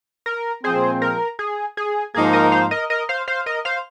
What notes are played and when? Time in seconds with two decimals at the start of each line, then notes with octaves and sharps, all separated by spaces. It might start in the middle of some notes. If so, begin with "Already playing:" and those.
0.26 A#4
0.63 A#2 F3 G#3 C4 G#4 C5
1.02 A#4
1.39 G#4
1.77 G#4
2.14 G#2 F3 A#3 D#4 G#4
2.33 A#4 D#5
2.52 C5 F5
2.71 A#4 D#5
2.90 A#4 D#5
3.09 C5 F5
3.28 C5 F5
3.46 A#4 D#5
3.65 C5 F5